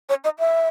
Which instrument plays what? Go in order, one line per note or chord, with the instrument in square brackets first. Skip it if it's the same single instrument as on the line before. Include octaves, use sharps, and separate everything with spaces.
[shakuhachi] C#5
D#5
E5